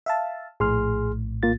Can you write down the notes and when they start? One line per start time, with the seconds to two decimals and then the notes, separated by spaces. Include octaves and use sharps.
0.06 E5 F5 A5
0.60 A#1 A2 G#4 C6 F6
1.43 A#3 F4 A6